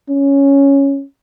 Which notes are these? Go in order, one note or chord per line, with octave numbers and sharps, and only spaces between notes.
C#4